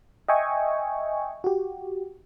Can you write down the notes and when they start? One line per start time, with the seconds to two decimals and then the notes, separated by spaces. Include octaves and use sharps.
0.28 D#5 E5 G5 G#5 C#6
1.44 F#4 G4